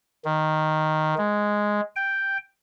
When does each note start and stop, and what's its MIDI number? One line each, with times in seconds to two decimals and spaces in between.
0.25 1.15 51
1.18 1.81 56
1.96 2.38 79